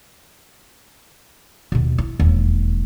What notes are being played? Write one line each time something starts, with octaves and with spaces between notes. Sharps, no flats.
D#2 B2
E4
E1 D#2